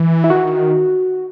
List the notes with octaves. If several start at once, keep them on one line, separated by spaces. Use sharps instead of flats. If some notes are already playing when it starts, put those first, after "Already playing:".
Already playing: E3
E4
D#3 F#4
E3
D#3